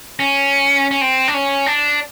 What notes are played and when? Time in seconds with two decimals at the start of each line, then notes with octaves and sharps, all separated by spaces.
0.19 C#4
0.91 C#4
1.01 C4
1.28 D4
1.34 C#4
1.66 D4